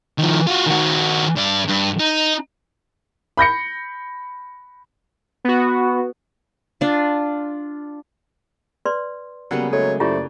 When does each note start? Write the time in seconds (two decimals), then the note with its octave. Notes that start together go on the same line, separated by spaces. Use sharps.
0.18 D#3 F3
0.47 F4 F#4
0.66 D#3 F#4
1.36 G2 D5
1.67 G2
2.00 D#4
3.38 B5 G6 A#6 C#7
5.45 B3 F#4
6.81 D4 F4
8.85 B4 D5 C6
9.51 C#3 F#3 G3 A#3 B3 F#5
9.73 F#3 G#3 A3 A4 C#5
10.00 F#2 A3 E4 F4 G4 C5 D5